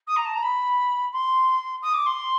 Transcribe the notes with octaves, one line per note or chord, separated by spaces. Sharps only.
D#6
A#5
A5
A#5
B5
C6
D#6
D6
C6